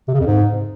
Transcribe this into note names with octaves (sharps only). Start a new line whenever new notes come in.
C3
C#3
F2
G#2